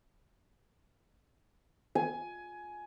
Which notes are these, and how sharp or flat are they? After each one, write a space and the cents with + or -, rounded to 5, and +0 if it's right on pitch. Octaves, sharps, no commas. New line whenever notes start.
G#5 +15